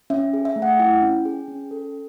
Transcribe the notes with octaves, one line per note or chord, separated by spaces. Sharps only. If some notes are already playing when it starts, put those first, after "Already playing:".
C#4 E5
G#4
E5
A3
F#5
E4 G5
C#4
G#4
C#4
A4